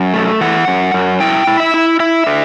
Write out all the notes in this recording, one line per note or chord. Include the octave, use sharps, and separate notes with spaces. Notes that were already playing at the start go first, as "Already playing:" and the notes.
Already playing: F#2
A3
E3 F#5
F#2
F#2
E4 G5
E4
E5
E4
E4 E5
D3